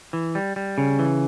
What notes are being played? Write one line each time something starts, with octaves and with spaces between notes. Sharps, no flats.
E3
G3
G3
C#3
E3